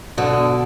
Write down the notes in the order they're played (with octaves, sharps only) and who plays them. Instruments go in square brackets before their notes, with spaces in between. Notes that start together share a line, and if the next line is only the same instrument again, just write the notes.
[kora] B2 [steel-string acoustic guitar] D3